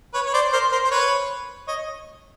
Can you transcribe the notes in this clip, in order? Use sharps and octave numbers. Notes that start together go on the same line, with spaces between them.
B4 C#5
C#5
C5 D5
A#4 C5
A#4 C5
C5
B4 C#5
C#5 D#5